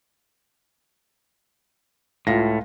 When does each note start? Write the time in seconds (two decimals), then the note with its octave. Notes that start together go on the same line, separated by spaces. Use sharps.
2.27 C#2 A2 F4 A#6